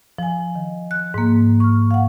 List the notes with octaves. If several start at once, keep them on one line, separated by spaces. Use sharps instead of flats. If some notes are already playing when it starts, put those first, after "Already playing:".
F3 G#5
D#3
F#6
G#2 A#3
C#6 F6
F5 F#5